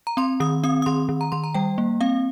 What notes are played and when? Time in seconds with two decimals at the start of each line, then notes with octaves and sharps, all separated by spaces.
0.07 A#5
0.17 C4 C6
0.40 D#3 D#6
0.64 C4 D#6
0.82 D#6
0.86 D#3 C6
1.09 D#3
1.21 A#5
1.32 D#3 C6
1.44 A#5
1.54 G3 G5
1.78 A#3
2.01 C4 F5